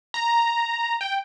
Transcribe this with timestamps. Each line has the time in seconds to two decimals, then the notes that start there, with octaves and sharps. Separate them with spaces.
0.14 A#5
1.01 G5